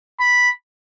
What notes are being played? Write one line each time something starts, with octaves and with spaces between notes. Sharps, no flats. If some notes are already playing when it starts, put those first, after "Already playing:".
B5